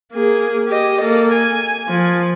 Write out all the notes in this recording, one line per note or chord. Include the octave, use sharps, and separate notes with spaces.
A#3 G#4
G4 D#5
A#3 A4
G#5
F3